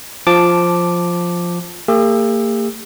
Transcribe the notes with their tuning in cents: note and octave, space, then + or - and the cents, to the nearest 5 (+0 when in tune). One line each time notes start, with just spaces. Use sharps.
F3 +0 A5 +0 D6 +0
A#3 -40 G4 +45 E6 +0